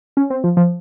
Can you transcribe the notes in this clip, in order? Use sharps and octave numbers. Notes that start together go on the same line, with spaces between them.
C#4
C4
F3
F3